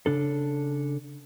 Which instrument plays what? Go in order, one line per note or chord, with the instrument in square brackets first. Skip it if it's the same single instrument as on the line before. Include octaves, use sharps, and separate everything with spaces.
[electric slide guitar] C#3 D4 A4